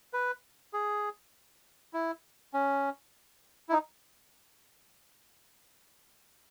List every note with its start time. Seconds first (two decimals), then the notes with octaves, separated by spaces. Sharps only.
0.13 B4
0.73 G#4
1.93 E4
2.54 C#4
3.69 E4
3.72 D#4